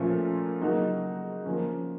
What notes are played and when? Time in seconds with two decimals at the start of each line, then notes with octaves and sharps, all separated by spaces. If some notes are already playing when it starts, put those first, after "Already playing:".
Already playing: A#2 F3 A3 C#4 F4
0.61 C#3 F#3 A#3 D#4 F#4
1.45 F3 A#3 C#4